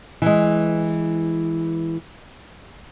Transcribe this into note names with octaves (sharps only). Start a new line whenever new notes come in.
E3 G#3